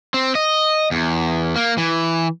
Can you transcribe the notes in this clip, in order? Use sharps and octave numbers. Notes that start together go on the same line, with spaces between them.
C4
D#5
E2
A#3
E3